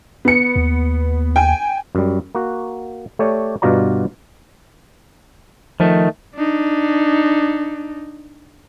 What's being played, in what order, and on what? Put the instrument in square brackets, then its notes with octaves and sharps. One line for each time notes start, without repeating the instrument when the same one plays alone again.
[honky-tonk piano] B3 C#7
[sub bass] D#2
[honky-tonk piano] G5 G#5
[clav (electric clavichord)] F#2 G3
A#3 F#4
A3 G4 C#5 D5
G2 B2 F4 F#4 D5 A#5
[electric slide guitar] D#3 A3 [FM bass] F3
[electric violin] D4 D#4